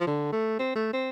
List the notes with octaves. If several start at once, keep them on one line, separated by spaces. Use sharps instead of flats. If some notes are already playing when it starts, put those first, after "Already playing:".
F3
D3
A3
C4
A3
C4